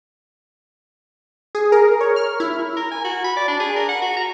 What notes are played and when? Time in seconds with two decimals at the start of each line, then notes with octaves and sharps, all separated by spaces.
1.55 G#4
1.72 A#4
2.01 C#5
2.16 F6
2.40 E4
2.77 A#4
2.92 G#5
3.04 F#4
3.24 B5
3.36 D5
3.48 D4
3.60 G#4
3.76 A#4
3.89 F#5
4.02 F#4
4.17 A#5